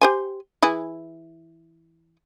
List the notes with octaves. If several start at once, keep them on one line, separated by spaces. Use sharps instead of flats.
G4 C5 G#5
E3 E4 G#4